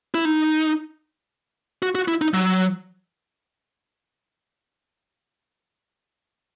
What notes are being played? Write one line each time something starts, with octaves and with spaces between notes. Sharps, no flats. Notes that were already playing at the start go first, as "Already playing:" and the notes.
E4
D#4
F#4
F#4
E4
D#4
F#3